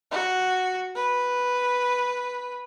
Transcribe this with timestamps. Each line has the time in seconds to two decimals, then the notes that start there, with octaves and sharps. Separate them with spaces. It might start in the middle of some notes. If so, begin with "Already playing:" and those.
0.11 F#4
0.95 B4